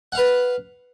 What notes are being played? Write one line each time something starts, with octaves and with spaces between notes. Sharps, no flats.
B4 F5 F#5